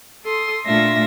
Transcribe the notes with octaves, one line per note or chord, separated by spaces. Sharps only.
A4 C6 D#6
A#2 A3 D4 F4 E5 A#6